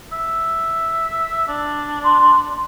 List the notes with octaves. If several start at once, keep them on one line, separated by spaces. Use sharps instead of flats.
E5
D4
C6